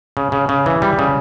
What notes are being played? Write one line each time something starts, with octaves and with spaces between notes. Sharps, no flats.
C#3
C#3
C#3
E3
G3
C#3